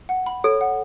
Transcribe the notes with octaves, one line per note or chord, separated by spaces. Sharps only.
F#5
B5
A4 C#5
F#5